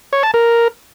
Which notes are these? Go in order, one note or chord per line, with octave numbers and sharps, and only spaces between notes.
C#5
A5
A#4